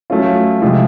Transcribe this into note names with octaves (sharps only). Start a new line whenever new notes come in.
F#3 A3 C#4 F4
C3 F3 G#3